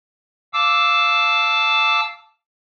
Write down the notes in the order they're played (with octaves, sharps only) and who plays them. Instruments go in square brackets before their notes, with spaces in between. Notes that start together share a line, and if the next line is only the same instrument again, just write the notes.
[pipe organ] F5 A5 D6 E6